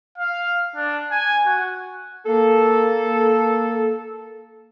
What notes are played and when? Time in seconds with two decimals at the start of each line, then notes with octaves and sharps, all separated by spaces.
0.18 F5
0.76 D4
1.11 G#5
1.46 F#4
2.25 A#3 A4